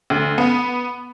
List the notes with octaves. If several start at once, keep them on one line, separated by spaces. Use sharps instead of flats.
D2
B3